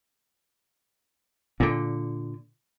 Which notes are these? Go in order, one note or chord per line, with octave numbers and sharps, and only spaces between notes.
A#2 D3